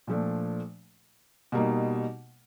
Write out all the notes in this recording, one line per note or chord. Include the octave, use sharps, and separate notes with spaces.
A#2 F3 A3 D4
B2 G3 A#3 D#4